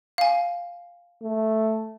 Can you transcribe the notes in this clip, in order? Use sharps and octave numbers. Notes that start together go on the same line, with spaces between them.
F5 G#5
A3